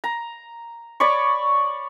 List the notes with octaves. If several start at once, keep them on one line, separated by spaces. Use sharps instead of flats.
A#5
C#5 D5 B5 C#6